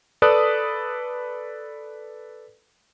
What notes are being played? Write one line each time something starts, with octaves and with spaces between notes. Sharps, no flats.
A4 B4 D5 B5 D#6 F#6